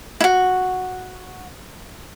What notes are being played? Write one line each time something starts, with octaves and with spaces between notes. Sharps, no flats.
E4 F#4